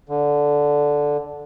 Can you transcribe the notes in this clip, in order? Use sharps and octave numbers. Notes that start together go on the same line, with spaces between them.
D3